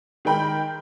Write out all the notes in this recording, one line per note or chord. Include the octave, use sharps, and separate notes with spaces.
D#3 G#3 A#4 G5 B5 G6